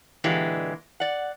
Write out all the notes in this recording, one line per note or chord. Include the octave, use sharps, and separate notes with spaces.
A#2 D3 E3 G#3 G4
D5 F#5